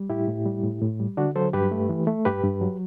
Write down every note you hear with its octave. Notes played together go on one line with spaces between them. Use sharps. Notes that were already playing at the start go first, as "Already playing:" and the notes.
Already playing: G3
A2 E4 G4
A2
G3
A2
A2
G3
D3 D4 F#4
F#3 A4 C5
G2 G4 B4
A3
E3
A3
G2 G4 B4
G2
F#3